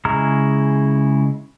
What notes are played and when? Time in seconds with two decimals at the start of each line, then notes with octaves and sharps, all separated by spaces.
0.05 C#3 G#3 E4 A#5 F6